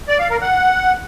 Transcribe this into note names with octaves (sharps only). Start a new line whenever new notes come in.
D5
F5
A#4
F#5